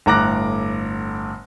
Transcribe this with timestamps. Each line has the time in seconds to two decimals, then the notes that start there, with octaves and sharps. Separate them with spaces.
0.06 G1 A2 A#5 D6 F#6 A#6